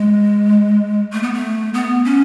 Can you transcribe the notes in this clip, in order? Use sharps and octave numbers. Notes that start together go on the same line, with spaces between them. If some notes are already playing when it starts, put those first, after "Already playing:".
Already playing: G#3
A3
B3
A3
B3
C#4